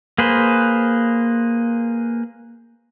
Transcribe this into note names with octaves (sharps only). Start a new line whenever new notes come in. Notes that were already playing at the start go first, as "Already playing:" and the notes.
A#3 G#4 B4 C5